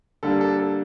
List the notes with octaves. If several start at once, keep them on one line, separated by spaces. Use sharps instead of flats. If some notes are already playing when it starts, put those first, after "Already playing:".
D3 G3 A#3 D4 A4
A4
A4